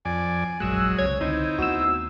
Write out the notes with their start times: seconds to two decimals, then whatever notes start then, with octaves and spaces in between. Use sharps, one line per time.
0.05 F2 D5 G#5
0.60 F1 A#1 F#2 F#3 G#3 E6 F#6
0.99 C2 C#3 C#5 G#6
1.21 C#2 D3 C4 D#4 E4
1.59 D#2 A3 B3 F#4 E6